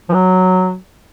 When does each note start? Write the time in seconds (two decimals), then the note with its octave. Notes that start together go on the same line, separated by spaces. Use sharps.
0.09 F3
0.14 F#3